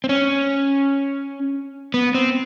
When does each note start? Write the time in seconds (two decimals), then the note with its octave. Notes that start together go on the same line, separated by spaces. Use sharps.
0.04 C4
0.09 C#4
1.94 B3
2.15 C4